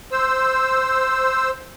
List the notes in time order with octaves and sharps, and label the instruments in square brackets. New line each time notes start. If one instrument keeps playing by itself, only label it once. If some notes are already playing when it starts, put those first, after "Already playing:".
[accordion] C5 E6